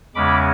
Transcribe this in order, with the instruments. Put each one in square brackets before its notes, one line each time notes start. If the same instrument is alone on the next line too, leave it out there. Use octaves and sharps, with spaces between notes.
[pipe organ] E2 C#3 G#3 C#4 B5 D6